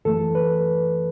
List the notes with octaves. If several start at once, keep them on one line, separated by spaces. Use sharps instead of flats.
F#2 E3 A3 A4
B4